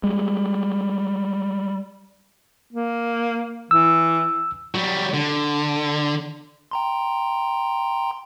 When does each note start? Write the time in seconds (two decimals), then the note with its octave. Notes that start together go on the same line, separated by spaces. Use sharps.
0.03 G3 G#3
2.73 A#3
3.71 E3 E6
4.75 F#3 G3
5.14 D3
6.71 G5 A#5 C6